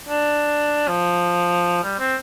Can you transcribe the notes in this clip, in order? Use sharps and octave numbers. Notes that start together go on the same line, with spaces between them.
D4
F3
G3
C4